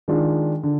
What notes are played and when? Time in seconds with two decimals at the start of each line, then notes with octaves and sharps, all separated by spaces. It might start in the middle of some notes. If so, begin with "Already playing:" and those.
0.08 D#3 G#3 D4 F4
0.63 D3